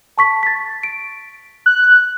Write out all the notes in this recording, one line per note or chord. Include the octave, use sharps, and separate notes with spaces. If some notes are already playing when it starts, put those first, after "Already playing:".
A5 C#6 B6
A6 B6
D7
F#6